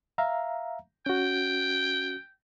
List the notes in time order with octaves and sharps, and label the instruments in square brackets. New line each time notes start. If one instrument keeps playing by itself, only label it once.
[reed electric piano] E5 F5 A#5
[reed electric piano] C#4 F#4 [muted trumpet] G5